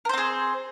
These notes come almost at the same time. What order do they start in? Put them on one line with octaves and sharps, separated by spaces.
A#4 C5 C4 G#4